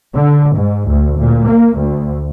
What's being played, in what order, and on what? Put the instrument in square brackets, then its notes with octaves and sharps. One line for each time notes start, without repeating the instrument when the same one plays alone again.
[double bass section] D3
G#2
D2
A#2
A#3
D2